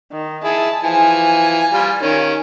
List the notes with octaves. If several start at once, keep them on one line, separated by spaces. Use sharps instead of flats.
D#3
E4 G#4 A5
E3 F3 G#5
G3 F4
D#3 C#4